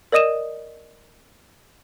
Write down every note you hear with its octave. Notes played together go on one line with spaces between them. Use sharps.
A#4 D5 D#5 D#6 D#7 E7